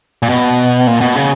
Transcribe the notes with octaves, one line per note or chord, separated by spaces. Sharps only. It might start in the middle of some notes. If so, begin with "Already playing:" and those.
A#2
B2
A#2
B2
C#3